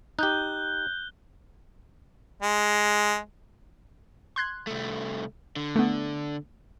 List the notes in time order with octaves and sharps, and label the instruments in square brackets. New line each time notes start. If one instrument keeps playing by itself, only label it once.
[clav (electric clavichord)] D#4 G4 [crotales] F#6 G6 G7
[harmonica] G#3
[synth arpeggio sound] C6 F#6 G#6
[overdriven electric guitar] C2 A3
D3
[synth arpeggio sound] A3 B3